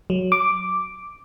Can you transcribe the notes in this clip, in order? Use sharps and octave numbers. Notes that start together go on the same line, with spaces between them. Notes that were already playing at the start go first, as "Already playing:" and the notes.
F#3
D6